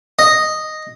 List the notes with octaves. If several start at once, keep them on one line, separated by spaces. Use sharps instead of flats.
D#5